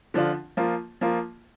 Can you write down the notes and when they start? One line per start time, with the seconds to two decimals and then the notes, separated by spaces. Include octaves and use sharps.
0.14 D3 F3 D4 F4
0.57 F3 A#3 F4
1.01 F3 A#3 F4